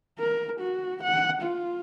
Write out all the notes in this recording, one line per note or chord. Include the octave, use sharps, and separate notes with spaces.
A#4
F#4
F#5
F4